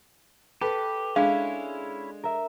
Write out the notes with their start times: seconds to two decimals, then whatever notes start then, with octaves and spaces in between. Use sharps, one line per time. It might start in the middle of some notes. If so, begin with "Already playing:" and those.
0.61 G4 A4 B4
1.16 G#3 C#4 D4 E4 F5
2.24 A#4 E5